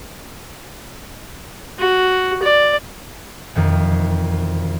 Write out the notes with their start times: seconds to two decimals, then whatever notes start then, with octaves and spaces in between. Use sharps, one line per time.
1.79 F#4
2.43 D5
3.55 E1 F2 D#3